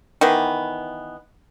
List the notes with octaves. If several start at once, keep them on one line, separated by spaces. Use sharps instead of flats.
D#3 E3 B3